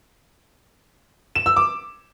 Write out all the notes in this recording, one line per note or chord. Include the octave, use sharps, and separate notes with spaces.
E7
E6
D6